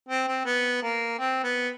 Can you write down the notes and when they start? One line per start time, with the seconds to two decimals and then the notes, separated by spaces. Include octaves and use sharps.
0.09 C4
0.28 C4
0.45 B3
0.83 A#3
1.19 C4
1.43 B3